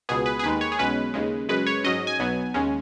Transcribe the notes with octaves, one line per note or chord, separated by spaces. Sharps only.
C#2 B2 B3 G#4
B4
G#4
D#2 D#3 G#3 B4
C#5
G#4
B1 B2 G#3 C#4 B4
D#2 C#3 G#3
F#2 C#3 G#3 B4
C#5
G#2 F#3 C#4 D#5
G#5
B1 B2 F#3 B3
D#2 C#3 G#3 C#4